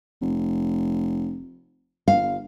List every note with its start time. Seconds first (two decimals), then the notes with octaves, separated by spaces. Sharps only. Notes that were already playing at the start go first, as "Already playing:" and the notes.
0.21 F1
2.08 G1 F5